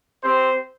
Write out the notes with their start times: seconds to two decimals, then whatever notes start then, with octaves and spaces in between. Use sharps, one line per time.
0.23 C4 G4 C5